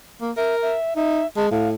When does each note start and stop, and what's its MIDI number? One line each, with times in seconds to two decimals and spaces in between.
0.21 0.31 58
0.37 0.74 70
0.37 0.56 76
0.62 0.94 76
0.96 1.21 63
0.96 1.26 76
1.37 1.49 56
1.37 1.47 81
1.51 1.75 45
1.51 1.69 77